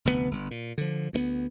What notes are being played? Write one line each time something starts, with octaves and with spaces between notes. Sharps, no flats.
F1 D2 B2 B3
G1
A#2
D3 F3
D2 A3 B3